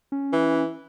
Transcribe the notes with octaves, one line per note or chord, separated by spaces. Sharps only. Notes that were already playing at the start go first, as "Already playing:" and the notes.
C#4
E3